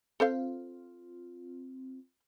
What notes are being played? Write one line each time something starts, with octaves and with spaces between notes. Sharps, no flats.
C4 F4 A4 C5 F5